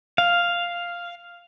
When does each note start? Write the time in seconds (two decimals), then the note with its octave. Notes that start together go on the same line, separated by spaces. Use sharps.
0.18 F5